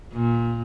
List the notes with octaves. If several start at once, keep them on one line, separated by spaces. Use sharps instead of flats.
A#2